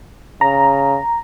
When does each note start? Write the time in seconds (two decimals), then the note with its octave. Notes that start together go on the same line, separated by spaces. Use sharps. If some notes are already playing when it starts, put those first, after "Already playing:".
0.41 C#3 A#5